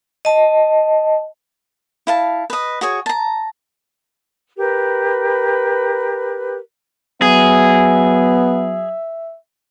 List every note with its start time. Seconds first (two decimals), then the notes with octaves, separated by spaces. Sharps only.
0.25 D#5 A5
2.07 E4 F5 A5
2.50 B4 D#5
2.81 F#4 G#4 C#5
3.06 A5 A#5
4.57 G4 A#4 B4
7.22 F#3 B3 G#4 E5